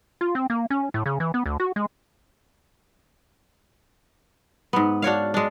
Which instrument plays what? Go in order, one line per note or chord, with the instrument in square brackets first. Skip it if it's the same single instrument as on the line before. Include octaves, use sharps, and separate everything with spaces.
[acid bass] F4
C4
A#3
C#4
A2
C#3
E3
B3
D2
F#4
G#3
[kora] G#2 B3
D4 F#4 C#5 F5
G#3 D4